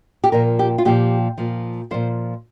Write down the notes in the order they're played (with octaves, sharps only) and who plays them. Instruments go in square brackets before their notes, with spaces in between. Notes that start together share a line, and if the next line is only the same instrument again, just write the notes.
[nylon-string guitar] G4
A#2 F3 A#4
G4
F4
A#2 F3 G4
A#2 F3
A#2 F3 C5